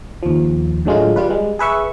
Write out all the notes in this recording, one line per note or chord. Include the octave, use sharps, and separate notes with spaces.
D#2 F3
A2 D3 F#3 G#3 A3 F4
G3 F4 B4
G3 G#3
G#4 B4 E5 C#6